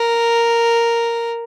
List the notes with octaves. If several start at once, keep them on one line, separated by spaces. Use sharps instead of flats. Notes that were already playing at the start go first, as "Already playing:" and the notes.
Already playing: A#4